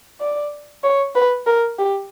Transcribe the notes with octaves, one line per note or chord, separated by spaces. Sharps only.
D5
C#5
B4
A#4
G4